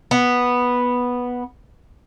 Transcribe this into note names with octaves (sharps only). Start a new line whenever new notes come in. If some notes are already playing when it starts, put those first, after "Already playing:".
B3